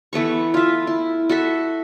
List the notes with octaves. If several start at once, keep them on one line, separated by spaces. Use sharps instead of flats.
E3 A3 B3 C#6
F4 E5
E4
F#4 A4 E5